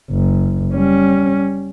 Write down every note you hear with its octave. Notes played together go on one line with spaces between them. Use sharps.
F#1
G3 C#4